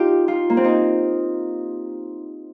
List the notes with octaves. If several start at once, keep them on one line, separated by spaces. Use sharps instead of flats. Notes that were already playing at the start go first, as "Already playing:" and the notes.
Already playing: D#4 F4 G4
F4
A#3
C4
D#4